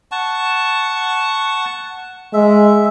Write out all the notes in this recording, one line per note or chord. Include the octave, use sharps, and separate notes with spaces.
F#5 A5 C#6
G#3 E5